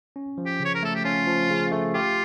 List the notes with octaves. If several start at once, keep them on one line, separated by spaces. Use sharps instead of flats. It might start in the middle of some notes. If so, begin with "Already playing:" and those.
C#4
F3
G4
C#3 C#5
A#4
A3 A4
G4
C#4 F4
F3
C#3
A3
F4 G4